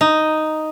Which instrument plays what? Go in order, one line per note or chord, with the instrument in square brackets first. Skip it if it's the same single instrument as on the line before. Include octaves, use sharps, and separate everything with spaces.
[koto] D#4